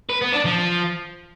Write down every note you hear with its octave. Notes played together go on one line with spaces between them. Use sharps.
B4
B3
D4
F3